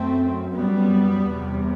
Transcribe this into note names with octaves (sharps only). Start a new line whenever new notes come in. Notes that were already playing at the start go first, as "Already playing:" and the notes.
Already playing: F#2 A3 C4
G3 B3
E2 C3